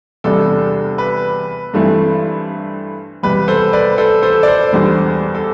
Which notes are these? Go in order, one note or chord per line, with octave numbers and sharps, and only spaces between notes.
E2 C3 G3 B3 D4 A4
B4
G2 E3 A3 C4 E4
E2 C3 G3 B4
A4 C5
B4 D5
A4 C5
A4 C5
D5
A4 C5
E2 D3 G3
A4